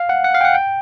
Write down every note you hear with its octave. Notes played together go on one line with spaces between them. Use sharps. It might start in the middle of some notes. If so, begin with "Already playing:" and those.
Already playing: F5
F#5
F#5
F5
G5
F#5
G5